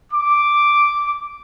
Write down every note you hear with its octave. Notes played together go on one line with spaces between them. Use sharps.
D6